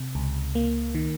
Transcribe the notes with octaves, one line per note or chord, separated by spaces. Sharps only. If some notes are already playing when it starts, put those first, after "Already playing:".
Already playing: C3
C#2
A#3
D#3